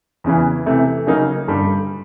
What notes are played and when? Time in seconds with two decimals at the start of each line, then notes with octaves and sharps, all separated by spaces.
0.24 E2 C#3 E3
0.66 C3 E3 A3
1.07 C#3 F#3 A#3 D#4
1.48 G2 D3 G3